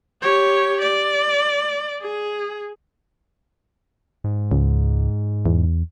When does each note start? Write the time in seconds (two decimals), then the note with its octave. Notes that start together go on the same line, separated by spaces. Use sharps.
0.22 G4 C#5
0.81 D5
2.01 G#4
4.24 G#2
4.51 C#2
5.46 E2